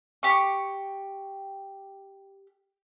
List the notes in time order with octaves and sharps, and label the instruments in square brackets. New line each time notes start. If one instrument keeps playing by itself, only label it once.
[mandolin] G4 C#6